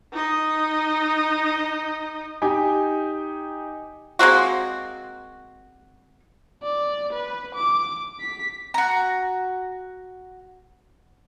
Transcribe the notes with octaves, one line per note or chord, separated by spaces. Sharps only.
D#4 D#5
D#4 G4 G5 G#5
G#3 A#3 C4 F#4
D5
B4
D6
B6
F#4 A#5